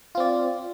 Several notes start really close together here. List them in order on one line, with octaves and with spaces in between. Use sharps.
F4 C4 D5